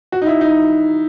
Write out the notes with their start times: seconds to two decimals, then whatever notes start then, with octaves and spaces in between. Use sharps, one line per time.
0.12 F#4
0.22 D#4
0.27 E4
0.41 D#4